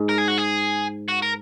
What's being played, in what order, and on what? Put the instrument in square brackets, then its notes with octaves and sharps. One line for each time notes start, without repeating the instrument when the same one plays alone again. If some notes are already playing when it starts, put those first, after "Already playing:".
Already playing: [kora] G#2
[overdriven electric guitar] A#4
G#4
F#4
G#4
F#4
A#4